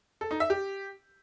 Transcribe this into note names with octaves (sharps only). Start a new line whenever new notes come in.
A4
D#4
E5
G4